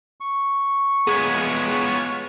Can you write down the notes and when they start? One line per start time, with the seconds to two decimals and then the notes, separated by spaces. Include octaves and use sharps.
0.20 C#6
1.07 G#3 B3 F4 G4 G#4 C#5 G#6